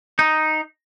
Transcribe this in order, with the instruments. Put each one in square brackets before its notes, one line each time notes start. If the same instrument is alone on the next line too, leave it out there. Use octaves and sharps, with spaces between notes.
[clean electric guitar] D#4